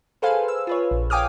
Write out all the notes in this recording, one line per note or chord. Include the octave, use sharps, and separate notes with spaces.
G#4 A4 B4 C5 F5 G#5
E6
F4 B4 C#5
A#1
F5 G5 G#5 D6 D#6 F6